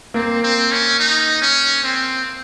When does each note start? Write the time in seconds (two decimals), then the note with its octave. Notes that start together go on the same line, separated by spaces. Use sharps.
0.14 A#3 C4
0.43 C4
0.72 C#4
0.99 D#4
1.41 C#4
1.84 C4